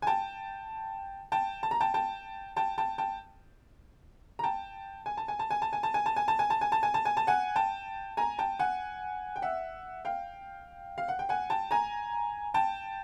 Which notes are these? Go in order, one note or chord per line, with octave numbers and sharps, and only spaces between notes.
G#5
G5 A5
G5 A5
A5
A#5
G5 A5
G5 A5
G5 A5
G5 A5
G5 A5
A#5
G5 A5
G#5
A5
G#5
A5
G#5
A5
G#5
A5
G#5
A5
G#5
A5
G#5
A5
G#5
A5
G#5
A5
G#5
A5
F#5 G#5
G5 A5
G#5 A#5
G5 A5
F#5 G#5
G5
E5 F#5
F5 G5
F5
F#5
G5
F#5 G#5
G5 A5
G#5 A#5
G5 A5